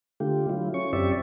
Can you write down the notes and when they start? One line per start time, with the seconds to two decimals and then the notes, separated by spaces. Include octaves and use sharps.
0.20 D3 A3 F4 G4
0.49 F#3 E4 F4
0.74 C#4 C#6
0.93 F#2 C4 G4 D5 E5 C#6